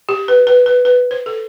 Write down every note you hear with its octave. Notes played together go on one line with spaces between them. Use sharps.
G4
B4
B4
B4
B4
C5
A4